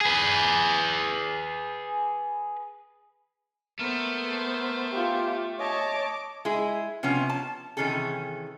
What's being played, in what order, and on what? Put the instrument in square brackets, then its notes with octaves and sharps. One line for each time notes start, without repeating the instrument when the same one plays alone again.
[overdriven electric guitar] G#4 B4
[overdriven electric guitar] A3 [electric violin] B3 C5 [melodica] A#4
[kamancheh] F4 G4
[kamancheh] C#5 A5 [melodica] D#5 [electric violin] D6
[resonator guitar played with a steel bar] G#3 E4 G#4
C3 F3 B3 C#4
A5
C3 D#3 E3 C#4 G#4 A4